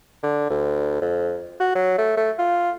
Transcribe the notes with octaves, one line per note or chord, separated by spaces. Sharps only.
D3
D2
F2
F#4
F#3
A3
A3
F4